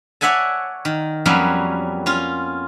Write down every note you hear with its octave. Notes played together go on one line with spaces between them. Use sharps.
C#5 D5 E5 F#5 G#5 A5
D#3
F2 F#3 G3 A#3 B3 C#4
C#4 F4